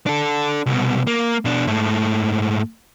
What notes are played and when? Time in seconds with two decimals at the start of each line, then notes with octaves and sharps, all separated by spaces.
0.06 D4 A4
0.66 C2 B2
1.07 A#3
1.45 B2 D4
1.67 G#2 A3